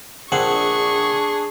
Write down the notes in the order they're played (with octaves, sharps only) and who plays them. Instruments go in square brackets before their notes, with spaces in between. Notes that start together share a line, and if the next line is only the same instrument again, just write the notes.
[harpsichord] A#1 C4 F#5 [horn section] D4 G#4 [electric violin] C#6